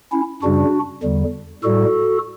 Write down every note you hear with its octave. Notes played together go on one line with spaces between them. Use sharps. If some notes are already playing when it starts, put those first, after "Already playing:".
C#4 E4
F#2 C#3 G3 D4 F#4
E2 D3 G3
A2 G3 F#4 A4